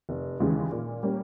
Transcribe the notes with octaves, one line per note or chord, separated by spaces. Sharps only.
F1
D#2 C#3 E3 G#3
A#2
G3 A#3 C#4